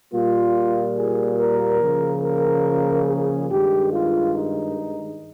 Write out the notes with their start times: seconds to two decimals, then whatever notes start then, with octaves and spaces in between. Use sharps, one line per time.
0.12 A#2 G3 A#3 F4
0.96 G#4
1.39 A#4
1.81 C#3 F3 A#3
2.23 A#4
3.08 G#4
3.49 G2 D#3 G#3 G4
3.91 F4
4.35 D#4